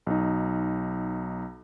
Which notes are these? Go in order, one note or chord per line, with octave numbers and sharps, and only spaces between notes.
B1 D#4